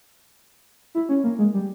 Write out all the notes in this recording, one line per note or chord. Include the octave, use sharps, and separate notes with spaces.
E4
C#4
A#3
G#3
G3